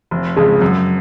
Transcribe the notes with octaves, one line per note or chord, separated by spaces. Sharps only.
F1
F2 C#3 G#3
F#2